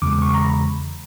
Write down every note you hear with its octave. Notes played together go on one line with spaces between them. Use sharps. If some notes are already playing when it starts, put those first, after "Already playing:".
E2 C#3 E3 G#3 D6
C#6
A#5
B5